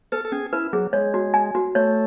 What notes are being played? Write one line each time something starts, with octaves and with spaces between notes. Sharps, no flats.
A4 B4
A4
C#4 G#4
E4 B4
F#3 G#4
G#3 C#5
F#4
G#5
F#4
A3 C#5